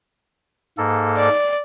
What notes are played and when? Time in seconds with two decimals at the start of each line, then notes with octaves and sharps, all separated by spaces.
0.78 G#2 A#3 A4
1.17 D5